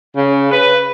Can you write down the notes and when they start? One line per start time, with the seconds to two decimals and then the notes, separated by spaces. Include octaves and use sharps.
0.16 C#3
0.51 B4